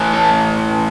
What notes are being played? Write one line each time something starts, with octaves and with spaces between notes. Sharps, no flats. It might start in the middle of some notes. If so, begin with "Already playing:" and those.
Already playing: A2 E3
A4